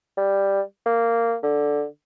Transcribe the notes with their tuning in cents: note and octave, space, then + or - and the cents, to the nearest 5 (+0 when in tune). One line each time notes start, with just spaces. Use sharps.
G3 +5
A#3 -15
D3 +0